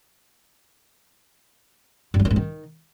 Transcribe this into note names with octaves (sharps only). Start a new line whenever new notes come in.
G2
F#3
D#3
G#2
D#3